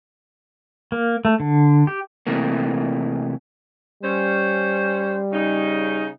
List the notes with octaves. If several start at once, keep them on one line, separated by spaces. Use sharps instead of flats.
A#3
A3
D3
G4
C3 E3 A3 A#3
G3 C#4 C5
C#3 D#4